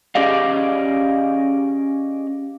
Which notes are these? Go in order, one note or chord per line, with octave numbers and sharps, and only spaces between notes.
C#4 G4 G#4 D5 D#5 F5